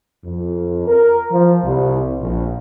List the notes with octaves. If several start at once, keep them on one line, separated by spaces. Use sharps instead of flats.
F2
A#4
F3
C2
A#1